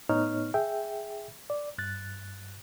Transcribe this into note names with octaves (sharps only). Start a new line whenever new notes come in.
A2 B3 D#4 C#5 F6
G#4 E5 G5
D5
G2 F#6 A6